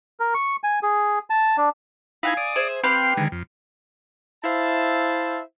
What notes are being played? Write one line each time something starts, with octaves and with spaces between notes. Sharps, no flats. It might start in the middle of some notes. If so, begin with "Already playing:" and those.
A#4
C#6
G#5
G#4
A5
D4
D#4 E4 F5 F#5 G#5 B5
D5 D#6
G#4 C5 E5
C4 G4 B4 F5 B5 C6
D3 D#3 G#3
F2
E4 C5 E5 F5 A5